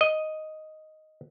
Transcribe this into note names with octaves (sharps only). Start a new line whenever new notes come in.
D#5